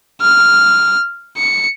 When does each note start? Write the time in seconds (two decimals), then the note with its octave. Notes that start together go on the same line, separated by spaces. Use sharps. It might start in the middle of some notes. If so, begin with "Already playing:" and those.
0.21 F6
1.38 C#7